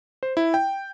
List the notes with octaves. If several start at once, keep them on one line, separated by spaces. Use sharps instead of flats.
C5
E4
G5